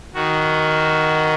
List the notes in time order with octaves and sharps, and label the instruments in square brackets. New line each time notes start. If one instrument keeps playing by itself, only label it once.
[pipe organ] D#3 F#4